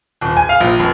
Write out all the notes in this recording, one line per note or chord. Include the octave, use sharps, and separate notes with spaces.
D#1
G#5
F5
A#1
F1